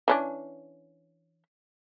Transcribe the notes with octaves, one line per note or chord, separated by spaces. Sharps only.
E3 C#4 D4